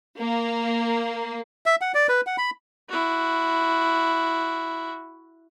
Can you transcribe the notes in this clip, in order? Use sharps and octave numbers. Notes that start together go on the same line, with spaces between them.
A#3
E5
F#5
D5
B4
F#5
B5
E4 F#4